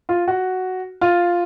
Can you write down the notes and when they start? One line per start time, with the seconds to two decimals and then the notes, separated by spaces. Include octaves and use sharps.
0.09 F4
0.28 F#4
1.01 F4